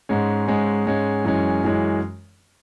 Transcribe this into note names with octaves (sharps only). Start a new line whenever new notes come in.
G#2 G#3 C#4
G#2 G#3 C#4
G#2 G#3 C#4
F#2 E3 G#3 C#4
F#2 E3 G#3 C#4